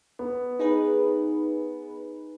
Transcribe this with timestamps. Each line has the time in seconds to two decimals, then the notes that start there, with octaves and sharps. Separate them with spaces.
0.19 B3
0.59 D#4 G#4 B4